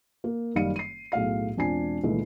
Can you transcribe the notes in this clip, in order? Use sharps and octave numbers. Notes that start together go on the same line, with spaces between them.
A#3
F#1 D#3 G3 F5 C#7 D#7
C7 D#7
B1 A2 G#4 F5 C7
E1 C4 D4 F4 G#5 C7
C#2 A#2 D#3 E3 A3